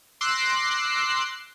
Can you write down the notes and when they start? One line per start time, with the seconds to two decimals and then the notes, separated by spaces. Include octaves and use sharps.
0.21 C6 D6 E6 F#6 A#6 C7